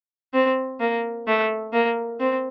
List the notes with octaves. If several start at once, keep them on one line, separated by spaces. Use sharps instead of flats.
C4
A#3
A3
A#3
C4